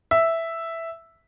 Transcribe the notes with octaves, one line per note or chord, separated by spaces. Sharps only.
E5